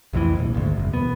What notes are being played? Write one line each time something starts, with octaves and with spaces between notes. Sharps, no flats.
C2 F2 A2 E3
D#1 A#1
G#1 D2
F#1 C2
E1 B3